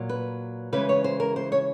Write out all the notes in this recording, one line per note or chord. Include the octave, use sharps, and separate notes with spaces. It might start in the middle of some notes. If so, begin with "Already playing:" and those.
Already playing: A#2 F#3
B4
C#3 E3 G#3 B4
C#5
C5
A#4
C5
C#5